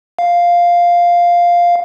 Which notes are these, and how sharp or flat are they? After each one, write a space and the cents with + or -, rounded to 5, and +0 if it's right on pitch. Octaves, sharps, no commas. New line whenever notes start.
F5 +0